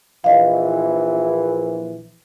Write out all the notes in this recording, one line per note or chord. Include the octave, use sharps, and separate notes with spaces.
A#1 E3 D#5 F5